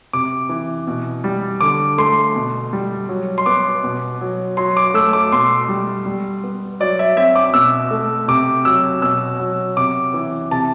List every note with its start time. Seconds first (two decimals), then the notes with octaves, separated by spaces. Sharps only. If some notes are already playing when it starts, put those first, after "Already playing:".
0.13 C3 D6
0.49 E3
0.87 B2
1.24 G3
1.61 D3 D6
1.98 A3 C6
2.36 B2
2.73 G3
3.09 F#3
3.38 C6
3.46 B3 D6
3.83 B2
4.21 F#3
4.57 F#3 C6
4.77 D6
4.94 A3 E6
5.13 D6
5.32 B2 C6
5.69 G3
6.06 G3
6.44 B3
6.80 F#3 D5
6.99 E5
7.17 C4 E5
7.36 D6
7.54 B2 E6
7.91 A3
8.28 C3 D6
8.65 F#3 E6
9.02 B2 E6
9.39 F#3
9.77 C3 D6
10.14 E3
10.51 C3 A5